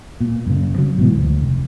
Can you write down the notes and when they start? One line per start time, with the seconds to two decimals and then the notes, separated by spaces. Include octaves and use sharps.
0.21 A#2
0.46 F#2 C#3
0.78 C#3 F#3
0.98 G#2 B2 E3
1.13 D2
1.42 F1